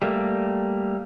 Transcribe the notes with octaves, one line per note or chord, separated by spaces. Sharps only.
G3 A3 A#3